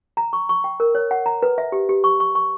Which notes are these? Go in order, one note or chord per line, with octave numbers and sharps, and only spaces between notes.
A#5
C#6
C#6
G5
A#4
C#5
F#5
A#5
B4
E5
G4
G4
C#6
C#6
C#6